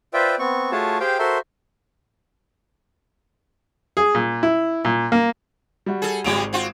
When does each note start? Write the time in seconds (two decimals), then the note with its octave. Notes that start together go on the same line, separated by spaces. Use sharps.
0.14 F4 B4 C5 D5 E5 G5
0.39 B3 C4 C#6
0.71 A3 F4 F#4 G#4 C#5 A5
1.00 G4 G#4 C5 F5 G5
1.19 F#4 A4 A#4 C5 E5 C6
3.97 G#4
4.15 A#2
4.43 E4
4.85 A#2
5.12 A#3
5.86 G3 F#4
6.02 G#4 A4
6.24 G#1 C#3 F#3 G3 D7 F7
6.53 C4 F4 F#4